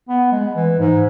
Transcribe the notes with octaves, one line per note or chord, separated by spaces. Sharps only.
B3
G#3
E3
G#2